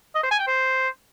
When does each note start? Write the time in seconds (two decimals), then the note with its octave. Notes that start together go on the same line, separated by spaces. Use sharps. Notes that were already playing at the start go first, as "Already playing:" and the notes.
0.15 D#5
0.23 C5
0.31 G#5
0.39 G5
0.47 C5